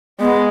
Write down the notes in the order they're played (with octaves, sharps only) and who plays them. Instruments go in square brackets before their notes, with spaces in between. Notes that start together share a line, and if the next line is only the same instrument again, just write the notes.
[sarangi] G#3 [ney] B3